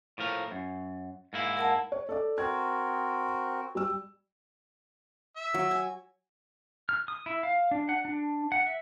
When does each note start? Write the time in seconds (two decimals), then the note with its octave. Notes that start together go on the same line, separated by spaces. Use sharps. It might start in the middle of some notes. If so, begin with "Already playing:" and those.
0.18 A2 F3 A#4
0.51 F#2
1.33 G#2 A#3 E4
1.57 A#4 F#5 A5
1.92 C#5
2.09 A4 D5
2.38 C4 F#4 A#4 G#6
3.75 G3 E6
5.36 E5
5.54 F#3
5.71 G#5
6.89 F6
7.08 D#6
7.26 E4
7.43 F5
7.71 D4
7.89 F#5
8.05 D4
8.52 F#5
8.66 E5